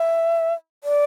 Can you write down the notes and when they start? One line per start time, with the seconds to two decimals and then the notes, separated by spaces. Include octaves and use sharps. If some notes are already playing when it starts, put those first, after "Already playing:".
Already playing: E5
0.84 D5